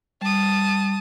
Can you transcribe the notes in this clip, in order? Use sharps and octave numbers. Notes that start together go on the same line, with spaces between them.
G3 A5 D#6